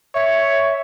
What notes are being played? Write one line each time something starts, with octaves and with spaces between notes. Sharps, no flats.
C#5 E5